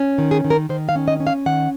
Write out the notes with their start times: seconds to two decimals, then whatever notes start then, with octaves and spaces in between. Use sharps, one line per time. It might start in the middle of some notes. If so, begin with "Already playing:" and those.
Already playing: C#4
0.18 D#3
0.31 G#4
0.44 D#3
0.50 A#4
0.69 D#3 C5
0.89 F5
0.96 C#4
1.08 D#5
1.20 C#4
1.27 F5
1.46 D#3 F#5